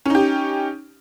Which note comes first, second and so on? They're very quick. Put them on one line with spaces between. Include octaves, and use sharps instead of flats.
C#4 D#4 G4